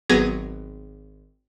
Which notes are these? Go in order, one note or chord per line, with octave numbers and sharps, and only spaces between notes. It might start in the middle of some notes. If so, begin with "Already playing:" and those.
G#1 F#3 B3 G#4 G#6 A#6